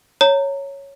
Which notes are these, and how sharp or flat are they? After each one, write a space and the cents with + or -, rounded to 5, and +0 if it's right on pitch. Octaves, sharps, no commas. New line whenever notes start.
C#5 +0 A#5 -25